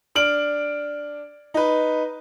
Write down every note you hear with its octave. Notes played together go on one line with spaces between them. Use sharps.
D4 F6 D7 F#7
D#4 B4